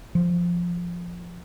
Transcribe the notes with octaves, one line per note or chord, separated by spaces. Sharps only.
F3